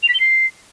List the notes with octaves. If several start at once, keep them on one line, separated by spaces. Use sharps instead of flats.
F7
B6
G7
C7